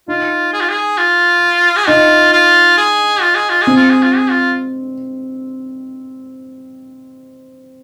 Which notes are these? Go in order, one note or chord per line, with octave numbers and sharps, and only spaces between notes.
D#4 F4
G#4
F4
G#4
F4
G#4
D#4 F4
F4
G#4
F4
G#4
F4
G#4
C4
F4
G#4
F4
G#4
F4